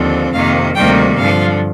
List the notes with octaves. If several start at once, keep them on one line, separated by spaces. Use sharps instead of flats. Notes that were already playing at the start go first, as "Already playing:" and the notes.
Already playing: D#2 D3 F3 C4
F2 C3 D#3 A#3 F5
D2 C3 D#3 G3 A#3 G5
G2 D3 F3 F5